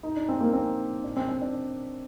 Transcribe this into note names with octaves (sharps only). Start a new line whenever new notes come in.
D#4
D4
C4
A#3
C4
D4
C4
C4
D4